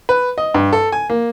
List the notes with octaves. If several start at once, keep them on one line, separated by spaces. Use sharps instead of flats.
B4
D#5
G2
A4
G#5
A#3